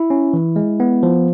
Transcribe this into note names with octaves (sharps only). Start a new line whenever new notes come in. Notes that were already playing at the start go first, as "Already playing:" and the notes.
Already playing: E4
C#4
E3
G#3
B3
F3